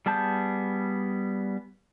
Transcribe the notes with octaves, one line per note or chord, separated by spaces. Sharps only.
G3 B3 G#4 A5 G6